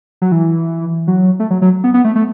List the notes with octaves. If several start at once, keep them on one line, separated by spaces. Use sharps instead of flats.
F#3
E3
F#3
A3
F#3
F#3
B3
B3
A3
A3